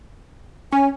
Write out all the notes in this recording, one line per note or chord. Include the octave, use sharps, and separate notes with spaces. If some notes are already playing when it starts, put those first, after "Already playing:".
C#4 G#5